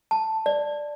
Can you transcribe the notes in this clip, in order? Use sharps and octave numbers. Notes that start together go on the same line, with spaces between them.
A5
D5